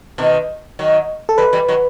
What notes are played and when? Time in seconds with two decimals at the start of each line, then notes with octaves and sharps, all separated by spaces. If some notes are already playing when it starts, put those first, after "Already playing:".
0.18 B2 D#3
0.79 D#3 F#3
1.29 A4
1.38 E3 G3 B4
1.53 E3 G3
1.68 D#3 F#3